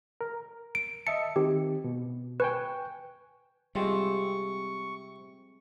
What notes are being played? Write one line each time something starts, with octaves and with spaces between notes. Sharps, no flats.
A#4
D7
D#5 E5 A5 C#7
D#3 C4 G4
B2
B4 G5 G#5 C#6
C3 G3 G#3 C4 F4 C#6